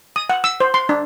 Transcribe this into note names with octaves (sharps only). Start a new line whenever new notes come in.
D#6
F#5
E6
C5
C6
D4